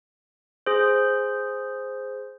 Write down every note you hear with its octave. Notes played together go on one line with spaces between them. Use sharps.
G#4 C5